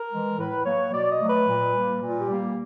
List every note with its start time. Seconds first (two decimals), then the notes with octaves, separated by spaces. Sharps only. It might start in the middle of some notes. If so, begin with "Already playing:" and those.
Already playing: A#4
0.11 E3 G#3
0.38 A2 B4
0.65 F#3 A#3 C#5
0.92 B2 D5
1.11 D#5
1.20 F#3 A3
1.29 B4
1.47 A#2
1.75 G3 A#3
2.02 A#2
2.20 G4
2.30 G3 A#3